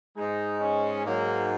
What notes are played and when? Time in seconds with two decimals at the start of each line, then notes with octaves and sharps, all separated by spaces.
0.16 G#2 G#3 D#4
0.61 C#4
1.05 G#2 F#3 A#3